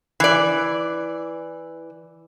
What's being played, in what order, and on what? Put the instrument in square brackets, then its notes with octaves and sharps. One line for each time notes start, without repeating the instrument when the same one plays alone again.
[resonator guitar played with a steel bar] E3 D5